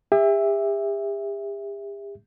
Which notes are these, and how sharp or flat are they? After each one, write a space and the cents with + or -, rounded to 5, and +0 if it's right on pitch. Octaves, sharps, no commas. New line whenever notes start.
G4 +45 E5 +0